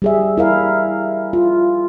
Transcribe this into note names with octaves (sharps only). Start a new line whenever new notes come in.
G3 G#4 E5
E4 A#4 F5
F4